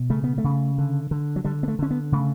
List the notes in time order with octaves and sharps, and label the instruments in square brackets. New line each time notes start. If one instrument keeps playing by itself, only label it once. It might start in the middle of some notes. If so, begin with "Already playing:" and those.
Already playing: [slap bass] B2
C#3 A3
B3
A3
C#3
D3
D3
F#3
D3 G3
B3
A3
D3 C#4
B3
C#3 A3